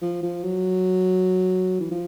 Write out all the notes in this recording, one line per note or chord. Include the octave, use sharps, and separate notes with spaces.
F3
F3
F#3
E3
F3